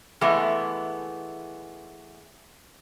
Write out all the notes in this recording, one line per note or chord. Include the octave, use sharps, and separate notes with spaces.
E3 G#3 A3 B3